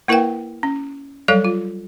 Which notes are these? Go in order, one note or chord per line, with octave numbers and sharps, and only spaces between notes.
A#3 E4 A#4 B4 F5 G5
C#4
F#3 G3 A4 C#5 F5
F4